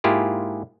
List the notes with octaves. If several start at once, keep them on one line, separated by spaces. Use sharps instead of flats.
G#2 A#3 E4 F4 G4 G#4